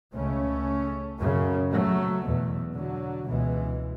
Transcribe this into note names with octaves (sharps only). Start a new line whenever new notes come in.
C#2 C#3 A3 C#4
F#2 C#3
F#3 A3
E2 B2
D3 F#3
C#2 B2 E3 G#3